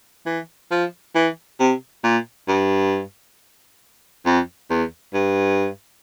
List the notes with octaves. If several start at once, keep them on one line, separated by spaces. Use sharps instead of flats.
E3
F3
E3
C3
A#2
G2
F2
E2
G2